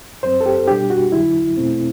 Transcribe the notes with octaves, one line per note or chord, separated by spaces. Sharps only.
F#2 F#3 C4 C5
A4
G4
B2 G3 D4 G4
F#4
E2 D3 F#3 E4
E2 B2 A3 C4